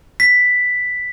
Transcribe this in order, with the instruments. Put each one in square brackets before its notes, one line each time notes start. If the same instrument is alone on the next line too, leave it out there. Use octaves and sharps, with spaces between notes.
[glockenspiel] B6